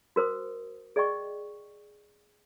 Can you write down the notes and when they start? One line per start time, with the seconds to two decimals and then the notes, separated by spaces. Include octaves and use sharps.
0.16 F#4 A#4 C5 D#6
0.96 G#4 D5 D#5 G5 C#6